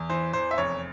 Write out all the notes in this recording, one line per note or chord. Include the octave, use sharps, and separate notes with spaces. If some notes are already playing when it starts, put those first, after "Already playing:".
Already playing: E2
E3 C5
E2 C5
E5
F1 C#5